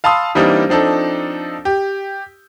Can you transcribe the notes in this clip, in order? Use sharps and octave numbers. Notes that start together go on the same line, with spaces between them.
F5 A5 B5 C6 D#6 E6
E3 G3 A#3 C4 D4 D#4
F3 C4 D4 D#4 A4
G4